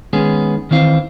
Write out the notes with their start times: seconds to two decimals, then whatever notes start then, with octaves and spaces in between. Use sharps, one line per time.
0.13 D#3 G#3 B3 C#4 G#4
0.71 D#3 E3 C4 F5